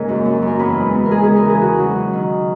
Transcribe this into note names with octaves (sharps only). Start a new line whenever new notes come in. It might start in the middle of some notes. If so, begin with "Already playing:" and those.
Already playing: G#2 C#3 A#3 A#4
F#2
F#2
F#2
A#4
E2 B4
G#3
E2
A#4
G#3 G#4
C#3 G#4
A#4
E3 G#4
C#3 F#4
F#3
C#3
D#3